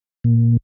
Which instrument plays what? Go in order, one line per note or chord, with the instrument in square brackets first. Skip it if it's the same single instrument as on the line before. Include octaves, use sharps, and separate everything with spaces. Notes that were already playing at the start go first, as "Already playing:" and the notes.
[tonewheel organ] A#2